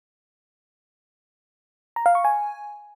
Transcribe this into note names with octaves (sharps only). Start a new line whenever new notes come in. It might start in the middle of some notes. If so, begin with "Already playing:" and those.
A#5
F5
C#6
G#5